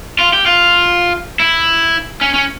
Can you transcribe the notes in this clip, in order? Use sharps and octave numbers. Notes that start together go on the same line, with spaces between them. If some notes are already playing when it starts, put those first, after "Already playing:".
F4
G4
F4
E4
C#4
C#4